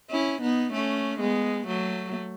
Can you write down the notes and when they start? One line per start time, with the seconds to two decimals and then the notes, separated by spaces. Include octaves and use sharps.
0.10 C#4 E4
0.42 B3 D#4
0.73 A3 C#4
1.20 G#3 B3
1.67 F#3 A3